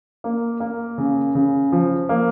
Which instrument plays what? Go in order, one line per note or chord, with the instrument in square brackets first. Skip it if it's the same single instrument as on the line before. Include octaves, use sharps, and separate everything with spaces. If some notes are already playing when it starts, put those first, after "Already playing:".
[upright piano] A#3
A#3
C#3
C#3
F3
A#3